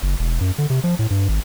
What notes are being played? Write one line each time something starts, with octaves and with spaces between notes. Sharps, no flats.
F#1
E1
F#2
D3
C3
F3
A2
G2
G#1